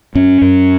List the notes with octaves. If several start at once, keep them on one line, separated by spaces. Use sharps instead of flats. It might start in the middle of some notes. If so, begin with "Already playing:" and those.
F#2 C#4
F#2